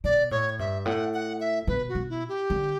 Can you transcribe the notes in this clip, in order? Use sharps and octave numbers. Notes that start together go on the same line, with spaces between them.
B2 D5
A2 C#5
G2 E5
A2 F#5
F#5
E5
B2 B4
F#4
B2
E4
G4
D3